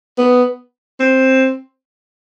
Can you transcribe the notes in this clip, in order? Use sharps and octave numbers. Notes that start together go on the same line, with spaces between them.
B3
C4